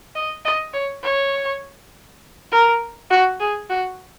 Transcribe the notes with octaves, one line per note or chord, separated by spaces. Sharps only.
D#5
D#5
C#5
C#5
A#4
F#4
G#4
F#4